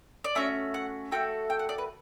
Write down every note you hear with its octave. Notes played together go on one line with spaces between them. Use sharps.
D5
A3 C#4 F#4 E5
F#5
A3 C#4 F#4 A4 G5
G5
F#5
D5
B4